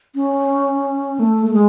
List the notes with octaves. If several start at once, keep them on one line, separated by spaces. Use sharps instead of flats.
C#4
A3
A3
G#3